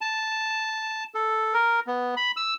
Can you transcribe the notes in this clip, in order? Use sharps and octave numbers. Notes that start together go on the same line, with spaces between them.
A5
A4
A#4
B3
B5
E6